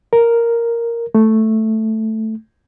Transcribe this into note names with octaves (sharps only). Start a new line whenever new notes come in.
A#4
A3